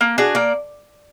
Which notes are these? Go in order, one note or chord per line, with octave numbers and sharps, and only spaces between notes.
A#3
D4 F#4 G#4
A#3 D5